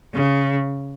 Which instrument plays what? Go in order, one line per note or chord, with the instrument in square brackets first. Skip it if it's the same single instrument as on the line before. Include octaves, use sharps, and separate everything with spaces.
[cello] C#3